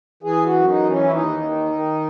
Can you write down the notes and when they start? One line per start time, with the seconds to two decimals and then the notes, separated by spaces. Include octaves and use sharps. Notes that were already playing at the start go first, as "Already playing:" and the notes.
0.23 E3 G#4
0.45 F#4
0.53 F#2
0.68 D#4
0.82 E3
0.90 C#4
1.03 E4
1.12 D#2 D#4
1.41 D#3
1.71 D#3